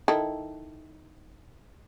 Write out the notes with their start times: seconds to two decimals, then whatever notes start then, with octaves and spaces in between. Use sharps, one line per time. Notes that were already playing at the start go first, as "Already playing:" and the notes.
0.08 D#3 E4 A4